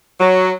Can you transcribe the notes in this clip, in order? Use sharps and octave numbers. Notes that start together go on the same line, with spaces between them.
F#3